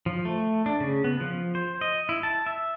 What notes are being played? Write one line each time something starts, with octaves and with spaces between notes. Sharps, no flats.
F3
A3
D4
C#3
B3
F3
C5
D#5
E4
A5
E5